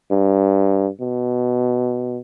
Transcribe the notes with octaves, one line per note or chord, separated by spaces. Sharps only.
G2
B2